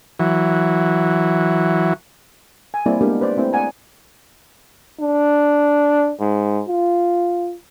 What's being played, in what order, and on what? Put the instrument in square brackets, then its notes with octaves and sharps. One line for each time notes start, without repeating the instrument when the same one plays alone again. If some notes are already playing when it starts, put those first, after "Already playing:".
[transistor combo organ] E3 F#3
[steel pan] G#5
G3 A#3 C4 E4 D5
G#3 A#3 B3 D4 G4 A#4
B4 C5 D5
A3 C4 E4 C5
D5 F#5 G#5 A#5
[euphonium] D4
G#2
F4